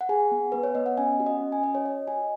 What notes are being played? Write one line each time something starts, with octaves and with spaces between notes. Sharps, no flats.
F#5
G#4 G#5
B3
B3 B4
C#5
B3 D#5
F#5
C#4 G#5
F#4
D#5
C#4
G#5
F#4 D#5
C#5
F#4 D#5
F#4 G#5